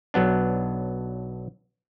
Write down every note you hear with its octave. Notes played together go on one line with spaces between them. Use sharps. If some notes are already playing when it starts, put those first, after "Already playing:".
B1 F#3 B3 D4